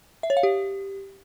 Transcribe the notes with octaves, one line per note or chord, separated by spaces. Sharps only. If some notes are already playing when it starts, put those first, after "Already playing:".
E5
C#5
F5
G4